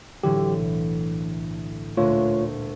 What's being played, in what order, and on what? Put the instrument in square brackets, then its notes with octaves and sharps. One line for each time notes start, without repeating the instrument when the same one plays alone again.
[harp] A2 D3 E3 [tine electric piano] F#3 G4
[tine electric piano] B1
[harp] D2 A#2 G#3 [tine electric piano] A3 F4 C#5